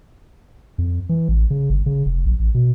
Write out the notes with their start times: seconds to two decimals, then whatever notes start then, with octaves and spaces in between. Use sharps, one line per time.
0.78 F2
1.09 E3
1.28 A1
1.50 C#3
1.70 G1
1.86 C#3
2.06 F1
2.26 A#1
2.39 A1
2.55 B2